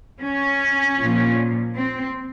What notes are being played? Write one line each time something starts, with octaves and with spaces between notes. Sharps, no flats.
C#4
A#2 F3
C4